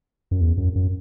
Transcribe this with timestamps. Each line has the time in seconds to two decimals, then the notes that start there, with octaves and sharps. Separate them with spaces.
0.31 F#2
0.41 E2
0.57 F#2
0.76 F#2